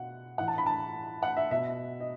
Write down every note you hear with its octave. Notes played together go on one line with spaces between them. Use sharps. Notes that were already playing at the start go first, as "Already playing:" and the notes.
Already playing: B2 F#5
A2 E3 F#5
A5
B5
A5
F#5
E5
B2 E5
D#5